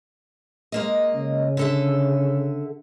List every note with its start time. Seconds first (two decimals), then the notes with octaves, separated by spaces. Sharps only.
0.72 G#3 A#3 D#5
1.15 C#3
1.57 D3 A4 E5